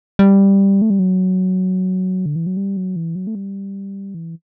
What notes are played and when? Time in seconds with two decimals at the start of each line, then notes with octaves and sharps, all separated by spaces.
0.19 G3
0.82 A3
0.90 G3
0.99 F#3
2.26 D3
2.36 E3
2.46 F#3
2.57 G3
2.77 F#3
2.96 E3
3.15 F#3
3.27 A3
3.35 G3
4.14 E3